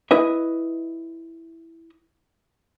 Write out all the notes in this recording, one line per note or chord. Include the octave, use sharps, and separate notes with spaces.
E4 B4 D#5 E5